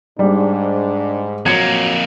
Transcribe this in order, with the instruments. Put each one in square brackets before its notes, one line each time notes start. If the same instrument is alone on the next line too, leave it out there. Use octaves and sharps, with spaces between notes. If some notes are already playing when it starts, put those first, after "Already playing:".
[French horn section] G#2 [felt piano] G3 [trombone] D4
[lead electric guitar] F2 A#3 [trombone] F#3 [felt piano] G#6 C#7